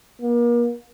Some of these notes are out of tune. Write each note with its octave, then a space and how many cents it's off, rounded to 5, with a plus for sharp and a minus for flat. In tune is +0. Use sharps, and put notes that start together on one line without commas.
A#3 +40